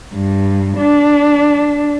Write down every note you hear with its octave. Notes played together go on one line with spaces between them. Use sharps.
G2
D4